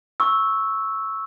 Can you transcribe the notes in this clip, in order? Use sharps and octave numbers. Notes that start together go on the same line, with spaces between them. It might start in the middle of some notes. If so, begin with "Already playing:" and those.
C#6 E6